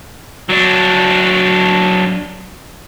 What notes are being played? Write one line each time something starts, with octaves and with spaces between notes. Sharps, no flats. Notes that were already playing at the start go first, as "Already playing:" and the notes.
F#3 D4